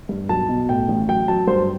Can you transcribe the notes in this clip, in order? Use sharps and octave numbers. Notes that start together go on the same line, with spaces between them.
G2
B1 A5
B2
A2 G5
A1
F#3 G5
F#3 A5
G2 C5